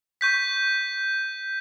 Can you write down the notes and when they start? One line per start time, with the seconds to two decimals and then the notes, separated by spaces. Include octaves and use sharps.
0.21 C#6 G6 B6